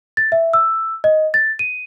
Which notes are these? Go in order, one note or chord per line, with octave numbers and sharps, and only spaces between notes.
A6
E5
E6
D#5
A6
D#7